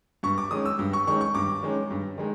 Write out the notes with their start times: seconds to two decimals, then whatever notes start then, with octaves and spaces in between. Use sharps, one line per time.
0.23 G2 C#6
0.38 D6
0.51 D#3 G#3 C#4 D#6
0.65 E6
0.79 G2
0.93 C#6
1.07 D#3 G#3 C#4 C#6
1.21 C#6
1.35 G2 D6
1.63 D#3 G#3 C#4
1.91 G2
2.18 D#3 G#3